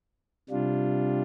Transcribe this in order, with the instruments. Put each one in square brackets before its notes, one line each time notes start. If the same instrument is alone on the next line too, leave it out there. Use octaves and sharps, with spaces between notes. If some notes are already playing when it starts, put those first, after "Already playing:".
[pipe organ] C3 G3 D4 F4